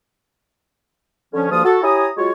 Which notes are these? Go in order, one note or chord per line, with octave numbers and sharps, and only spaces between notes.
D3 F3 C#4
D2 G2 F3 A#3 F4 D#6
F#4 A4
E4 G4 C#5 G#5 A#5 D#6
F#3 G#3 F4 F#4 C#5